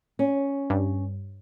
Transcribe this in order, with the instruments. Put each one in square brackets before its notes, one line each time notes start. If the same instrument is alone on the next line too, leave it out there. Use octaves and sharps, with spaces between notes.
[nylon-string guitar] C#4
[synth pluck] G2